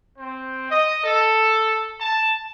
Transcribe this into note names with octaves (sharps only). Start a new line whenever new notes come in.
C4
D#5
A4
A5